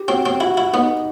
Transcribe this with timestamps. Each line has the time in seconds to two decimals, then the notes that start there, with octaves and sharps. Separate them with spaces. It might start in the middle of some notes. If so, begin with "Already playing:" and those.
Already playing: G4
0.08 C4 F#4
0.26 C4
0.40 E4 F#4
0.57 E4
0.73 B3 D#4